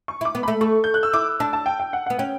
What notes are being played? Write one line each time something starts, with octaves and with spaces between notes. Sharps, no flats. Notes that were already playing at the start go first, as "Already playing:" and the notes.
C#6
E4
D6
B3
A3 B5
A3 C#6
G6
F#6
E6
E4 D6
D4 A5
A5
G5
G5
F#5
B3 F#5
C#4 G5